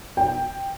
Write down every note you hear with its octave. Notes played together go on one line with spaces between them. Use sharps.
G5